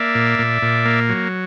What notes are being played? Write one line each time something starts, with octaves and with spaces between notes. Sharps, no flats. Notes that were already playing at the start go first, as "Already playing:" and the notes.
Already playing: A#3 D5 E5
A#2
A#2
A#2
A#3
F#3